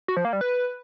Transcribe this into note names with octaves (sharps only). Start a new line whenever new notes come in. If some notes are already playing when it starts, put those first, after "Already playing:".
F#4
F3
A#3
G3
B4